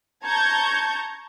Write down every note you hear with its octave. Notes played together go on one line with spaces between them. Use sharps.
A5 A#5 C#6 G6 G#6